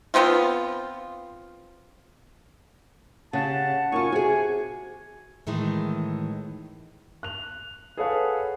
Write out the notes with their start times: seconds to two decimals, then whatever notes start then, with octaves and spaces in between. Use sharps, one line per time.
0.14 F3 B3 C4 F4
3.33 C#3 G4 F#5 A5
3.92 F#2 D#4 F4 G#5 C#6
4.12 C3 F#4 G#4 G#5
5.47 A2 D#3 E3 G#3
7.23 F#6 F7
7.97 G#4 A4 B4 C#5 F5 F#5